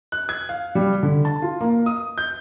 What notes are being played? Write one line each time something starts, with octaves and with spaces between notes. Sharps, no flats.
F#6
G#6
F5
G3
D3
A5
F4
A#3
D#6
G6